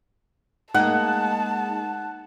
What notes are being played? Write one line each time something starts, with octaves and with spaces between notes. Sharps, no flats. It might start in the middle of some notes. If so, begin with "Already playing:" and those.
G#3 A#3 D#4 F#5 A5